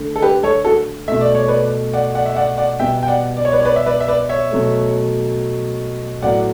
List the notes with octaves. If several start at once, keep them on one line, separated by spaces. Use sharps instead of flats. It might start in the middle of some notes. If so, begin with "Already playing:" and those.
Already playing: D3 A3
A4
G4 B4
A4 C#5
F#4 A4
B2 A3 E5
D5
C#5
B4 D5
D5 F#5
D5 F#5
E5
D5 F#5
D5 F#5
B2 G3 B3 E5 G5
G5
D5 F#5
D5
C#5
B4 D5
C#5
B4 D5
E5
B4 D5
E5
B4 D5
C#5 E5
B2 F#3 A3
A2 F#3 B3 D5 F#5